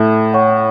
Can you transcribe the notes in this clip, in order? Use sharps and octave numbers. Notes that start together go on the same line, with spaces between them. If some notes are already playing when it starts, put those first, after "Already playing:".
Already playing: A2 A4 E5 A5
C#5 F#5 C#6